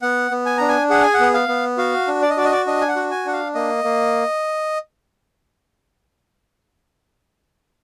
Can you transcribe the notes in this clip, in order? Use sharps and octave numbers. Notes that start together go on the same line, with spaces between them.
B3 F#5
B3
G#5
D4 A#5
G#5
G#4 F#5
G#5
F#5
B3
F5
B3
F#4 F5
D4
D5
D#5
F#4 D5
D#5
D5
D4 D#5
G#5
F#5
F#4
G#5
D4 F#5
F5
A#3 D#5
A#3